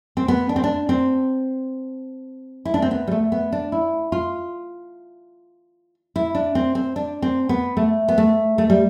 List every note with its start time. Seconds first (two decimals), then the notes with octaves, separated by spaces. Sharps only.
0.17 C4
0.28 B3
0.49 D4
0.56 C4
0.64 D4
0.89 C4
2.65 E4
2.74 D4
2.82 C4
2.91 B3
3.07 G3
3.11 A3
3.32 B3
3.52 D4
3.72 E4
4.12 F4
6.16 E4
6.35 D4
6.55 C4
6.75 C4
6.96 D4
7.22 C4
7.49 B3
7.77 A3
8.08 B3
8.18 A3
8.58 A3
8.70 G3